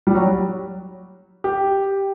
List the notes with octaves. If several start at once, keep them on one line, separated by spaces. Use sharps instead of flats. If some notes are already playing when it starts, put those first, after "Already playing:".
G3
F#3
G4